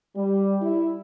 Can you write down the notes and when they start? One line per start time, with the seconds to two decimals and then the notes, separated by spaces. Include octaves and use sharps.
0.16 G3
0.62 E4